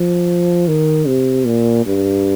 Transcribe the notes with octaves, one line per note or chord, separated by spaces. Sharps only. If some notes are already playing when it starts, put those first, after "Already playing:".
Already playing: F3
D#3
C3
A#2
G2